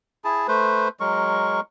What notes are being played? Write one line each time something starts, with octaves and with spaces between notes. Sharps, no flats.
E4 G#4 A5
A3 B4 C5
F#3 G#3 A#4 C#6